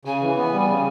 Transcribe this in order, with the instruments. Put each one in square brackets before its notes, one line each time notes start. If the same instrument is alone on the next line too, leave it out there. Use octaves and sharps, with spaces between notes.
[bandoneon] C#3 [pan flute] G#5
[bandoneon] E3
B3
G3
C#3